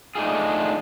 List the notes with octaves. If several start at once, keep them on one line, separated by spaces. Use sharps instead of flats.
A3 D4 D#4 F4 G#4